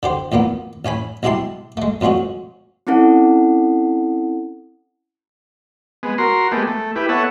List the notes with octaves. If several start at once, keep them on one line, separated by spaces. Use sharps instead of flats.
D3 G4 C5
E2 A#2 A#3 B3
A1 C#4 G#5 B5
B1 G#3 E4 G4 A5 C6
G#3 A3
F2 A#2 G#3 C#4 F#4
C4 C#4 E4 A4 F#5
G#3 B3
F#4 A#4 C6
G#3 A3 B3 G4
A3
E4 G4 B4
B3 A4 C#5 E5 F#5